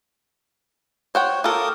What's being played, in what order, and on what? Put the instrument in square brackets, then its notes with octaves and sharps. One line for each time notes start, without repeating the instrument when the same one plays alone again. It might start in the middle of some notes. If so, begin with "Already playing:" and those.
[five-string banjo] C5 F#5 G5 [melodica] C#5
[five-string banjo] F4 A4 [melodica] A#4 D6 D#6